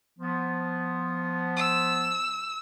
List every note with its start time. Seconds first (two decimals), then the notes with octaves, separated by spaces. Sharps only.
0.19 F3 B3
1.57 E6